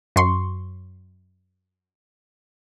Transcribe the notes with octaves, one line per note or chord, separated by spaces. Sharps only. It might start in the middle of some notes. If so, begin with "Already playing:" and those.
F#2 C6 C#6